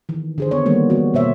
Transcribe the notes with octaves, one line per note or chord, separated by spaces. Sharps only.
D#3 E3
D3 G#4 C5
B3 C#5
D#3 E3 G3 A#3 B3
E3 B3 F#4
B2 A#3 C5 C#5 E5